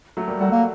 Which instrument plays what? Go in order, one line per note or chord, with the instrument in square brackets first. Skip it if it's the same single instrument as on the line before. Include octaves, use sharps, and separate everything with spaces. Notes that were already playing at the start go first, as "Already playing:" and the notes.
[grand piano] F#3 A3
G3 A#3
[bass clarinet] G3 [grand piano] F#4 A4
[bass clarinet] A#3